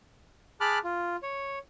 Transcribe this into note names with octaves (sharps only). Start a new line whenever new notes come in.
G#4 A5 B5 D6 F6 F#6
F4
C#5